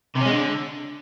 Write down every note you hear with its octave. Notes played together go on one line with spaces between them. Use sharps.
C3
C#4
G#3
D3